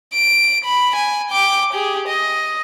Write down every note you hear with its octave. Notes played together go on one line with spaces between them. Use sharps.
D7
B5
G#5
G5 D6
G4 G#4
D#5